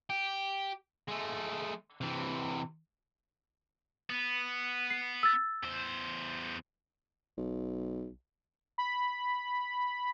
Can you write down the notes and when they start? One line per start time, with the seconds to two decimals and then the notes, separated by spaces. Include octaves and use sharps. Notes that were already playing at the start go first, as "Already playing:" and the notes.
0.10 G4
1.08 G#3 A3
2.01 C3 E3
4.10 B3
4.90 C7
5.23 E6 A6
5.63 E2 C5
7.37 B1
8.78 B5